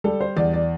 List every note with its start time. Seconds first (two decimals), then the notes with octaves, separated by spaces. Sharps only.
0.04 G3 A4
0.21 C5
0.37 E2 D5
0.53 D5